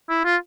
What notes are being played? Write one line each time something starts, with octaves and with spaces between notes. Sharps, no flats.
E4
F4